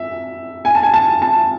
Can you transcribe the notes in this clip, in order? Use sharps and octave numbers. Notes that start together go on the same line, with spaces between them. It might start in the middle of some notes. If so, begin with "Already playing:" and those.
Already playing: E5
G#5
A5
G#5
A5
A5